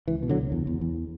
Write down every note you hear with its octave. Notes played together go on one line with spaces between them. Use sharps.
C#2 E3
B2
D3 F#3
C#2
E2
E2
E2